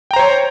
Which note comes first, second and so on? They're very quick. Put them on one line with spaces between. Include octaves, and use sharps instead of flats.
G5 A#5 C5 C#5